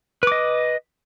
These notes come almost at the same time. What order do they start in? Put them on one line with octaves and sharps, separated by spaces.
B4 D6 D#5